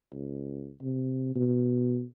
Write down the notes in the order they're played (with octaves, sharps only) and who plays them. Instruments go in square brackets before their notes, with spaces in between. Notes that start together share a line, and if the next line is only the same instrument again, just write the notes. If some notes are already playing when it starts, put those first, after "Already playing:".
[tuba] C#2
C3
B2